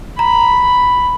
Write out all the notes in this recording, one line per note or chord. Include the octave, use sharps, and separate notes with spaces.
A#5 B5